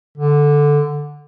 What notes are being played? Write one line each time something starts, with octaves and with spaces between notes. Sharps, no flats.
D3